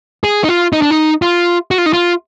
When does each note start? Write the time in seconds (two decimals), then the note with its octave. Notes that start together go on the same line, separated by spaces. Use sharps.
0.24 G#4
0.44 D#4
0.49 F4
0.73 D#4
0.82 D4
0.91 D#4
1.22 F4
1.71 F#4
1.78 F4
1.86 D#4
1.93 F4